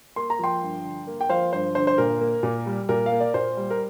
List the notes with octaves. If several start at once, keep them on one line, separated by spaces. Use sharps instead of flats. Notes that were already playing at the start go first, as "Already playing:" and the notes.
A#3 C6
A#5
F3 G5 C6
G2
D3
A#3
G5
F3 C5 F5
G2 C5
D3 C5
C5
A#2 A#4
A#3
A#2
G3
A#2 A#4
F5
A#3
D5
A#2 C5
G3
A#4